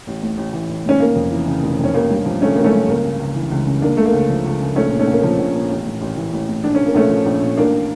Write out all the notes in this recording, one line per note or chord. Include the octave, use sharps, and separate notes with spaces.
A1
A2
A1
E3
A1
A2 C#4
F1 A#3
F2
E3
C#3
F1
F2
C#4
A1 A#3
G2
F3
D3 A3 C#4
A1 A#3
A3 C#4
G2
C#2 A#3
C#3
C#2
E3
C#2
C#3
C#2 A#3 D4
C#3 A3
A#3
C#2
F3
C#2
C#3
A#1 A3 C#4
A#2
A3 C#4
A#1 A#3
F3 A#3
A#1
A#2
A1
A2
A1
E3
A1
A2
A#1 D4
C#4
A#2
A#3
A#1 A3 C#4
F3
A#1
A#2
A1 A#3 D4